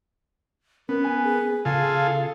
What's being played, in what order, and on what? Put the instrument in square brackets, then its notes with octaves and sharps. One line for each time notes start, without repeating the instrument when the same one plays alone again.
[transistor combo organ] B3 [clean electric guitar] C#4 [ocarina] A#4
[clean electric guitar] G#5
[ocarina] G#4
[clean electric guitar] C#3 [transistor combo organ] F4 G#4 A4 [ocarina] F5